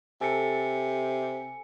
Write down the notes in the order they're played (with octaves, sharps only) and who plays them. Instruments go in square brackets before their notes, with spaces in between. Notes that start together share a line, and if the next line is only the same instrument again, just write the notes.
[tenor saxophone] C3 [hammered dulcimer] A4 [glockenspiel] G#5 C#7